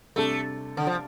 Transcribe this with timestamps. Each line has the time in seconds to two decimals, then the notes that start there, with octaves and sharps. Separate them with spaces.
0.16 C3 G3 A3 D4 A4
0.77 D3
0.87 F3